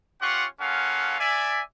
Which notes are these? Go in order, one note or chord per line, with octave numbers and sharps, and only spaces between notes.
C#4 F4 G4 F#5 C6 C#6
A#3 C#4 F4 A4 F5 F#5
D5 E5 G#5